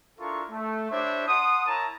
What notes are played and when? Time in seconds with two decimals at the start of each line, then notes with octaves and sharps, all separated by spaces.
0.19 D4 E4 F4 A4 A#4 C#6
0.51 A3
0.91 D4 E4 G4 C5 C#5 E5
1.27 F#5 A5 C6 D#6
1.67 E4 A#4 C#5 A5 A#5